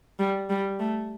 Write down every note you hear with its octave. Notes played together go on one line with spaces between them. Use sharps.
G3
G3
A3